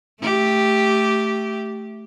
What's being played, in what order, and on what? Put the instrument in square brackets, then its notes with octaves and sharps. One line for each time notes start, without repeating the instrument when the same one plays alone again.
[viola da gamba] A3 G4